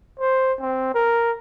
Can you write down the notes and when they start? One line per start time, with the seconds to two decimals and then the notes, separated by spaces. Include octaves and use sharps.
0.20 C5
0.60 C4
0.95 A#4